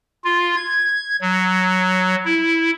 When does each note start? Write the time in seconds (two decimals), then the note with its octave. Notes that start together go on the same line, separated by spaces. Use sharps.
0.24 F4
0.56 G#6
1.21 F#3
2.25 E4